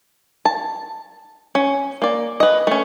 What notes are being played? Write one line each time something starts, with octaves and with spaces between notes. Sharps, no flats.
A5
C#4
A#3 D5
B4 D#5
A3 C#4